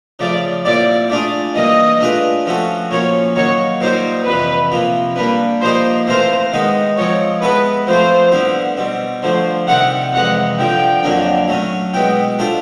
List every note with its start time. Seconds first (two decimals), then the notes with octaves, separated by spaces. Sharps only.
0.19 C#3 F3 A3 D5
0.65 A#2 G3 C4 E4 D5
1.10 A3 D4 F4 G#4 D5
1.55 E3 G3 A#3 D#5
2.01 A3 D4 F4 G#4 B4
2.46 F3 A3 C#4 F#4 A4
2.91 A#2 F3 A#3 C#4 C#5
3.36 D#3 F#3 A#3 C#5
3.81 A#2 G3 C4 D#4 G4 C5
4.26 F2 C3 E3 B4
4.72 C3 F3 A#3
5.16 G3 A#3 D4 B4
5.61 F3 A#3 D#4 G4 C5
6.06 E3 A3 C4 F4 A#4 C5
6.52 D#3 G#3 B3 D#4
6.97 F3 G#3 C4 C#5
7.42 G#3 B3 E4 A4 B4
7.87 F3 A3 C4 F4 C5
8.32 D3 G3 B3 E4
8.77 B2 G3 C4
9.22 D3 F3 A3 C5
9.67 C3 D#3 G3 C4 E4 F#5
10.13 F2 C3 E3 G#3 F#5
10.58 G2 D3 F3 G5
11.03 F2 D3 F#3 A#3 D4
11.48 F#3 A3 C#4
11.93 B2 G#3 B3 E4 G5
12.39 A3 D4 F4 A4 C5